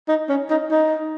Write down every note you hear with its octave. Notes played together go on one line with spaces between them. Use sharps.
D#4
C#4
D#4
D#4